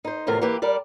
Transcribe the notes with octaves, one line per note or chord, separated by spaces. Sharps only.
D#4 C5
E2 A2 C3 F3 A#4
E3 A#3 G4 B4
G3 A#4 D5